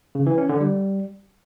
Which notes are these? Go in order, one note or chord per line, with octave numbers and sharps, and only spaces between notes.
C#3
E3
C#4
D3
G3